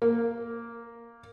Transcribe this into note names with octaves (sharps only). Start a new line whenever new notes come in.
A#3